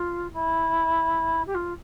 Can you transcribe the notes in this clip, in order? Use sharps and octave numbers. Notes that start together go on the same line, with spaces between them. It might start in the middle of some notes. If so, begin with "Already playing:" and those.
Already playing: F4
E4
G4
F4